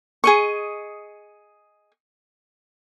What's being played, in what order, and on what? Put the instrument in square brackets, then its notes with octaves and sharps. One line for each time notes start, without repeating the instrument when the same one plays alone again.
[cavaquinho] G#4 D#5 C#6